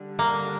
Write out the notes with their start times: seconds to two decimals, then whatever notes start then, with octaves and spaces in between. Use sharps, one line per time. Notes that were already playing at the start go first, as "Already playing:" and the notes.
Already playing: D3 G3 D4
0.19 A#3